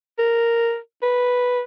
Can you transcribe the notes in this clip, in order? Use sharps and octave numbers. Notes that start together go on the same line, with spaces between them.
A#4
B4